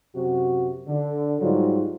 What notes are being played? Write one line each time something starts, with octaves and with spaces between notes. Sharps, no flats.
F#2 C3 F#4
D3
G#2 F#3 G3 F4